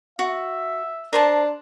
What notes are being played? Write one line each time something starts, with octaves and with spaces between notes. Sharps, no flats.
F#4 E5
D4 A#4 C5 A5